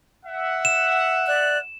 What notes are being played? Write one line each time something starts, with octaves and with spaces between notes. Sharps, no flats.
E5 F#5
E7
D5 F#6